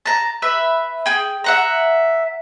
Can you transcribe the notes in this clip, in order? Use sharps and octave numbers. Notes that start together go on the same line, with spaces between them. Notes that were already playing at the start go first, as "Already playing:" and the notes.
A5 A#5
B4 E5 B5
G#4 G5
E5 F#5 A#5